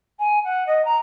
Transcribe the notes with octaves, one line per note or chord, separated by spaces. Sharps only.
G#5
F#5
D#5
A#5